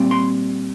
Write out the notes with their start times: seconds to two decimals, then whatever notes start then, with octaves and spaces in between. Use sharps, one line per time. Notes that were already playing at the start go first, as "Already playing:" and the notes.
Already playing: A#2 G3 C4
0.11 C6